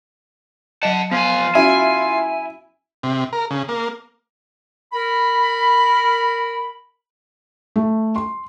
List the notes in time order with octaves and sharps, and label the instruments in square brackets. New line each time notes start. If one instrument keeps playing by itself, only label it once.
[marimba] F#3 D#5 [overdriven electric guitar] F#5 A5
[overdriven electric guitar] F3 G#5 [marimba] B3 [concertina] F4 F5
[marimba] C#4 F#4 [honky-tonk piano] E4 [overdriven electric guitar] G#5
[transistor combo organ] C3
A#4
C#3
A#3
[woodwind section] A#4 B5
[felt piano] A3
C6